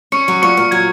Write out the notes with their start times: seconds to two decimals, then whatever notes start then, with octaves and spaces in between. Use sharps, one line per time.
0.12 C#4 C#6 C#7
0.28 F#3
0.42 A#2 C#6 C#7
0.57 A#2
0.71 F#3 G#6